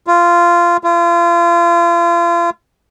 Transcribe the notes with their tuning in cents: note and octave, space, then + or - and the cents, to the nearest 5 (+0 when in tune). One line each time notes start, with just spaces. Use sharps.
F4 -15
F4 -35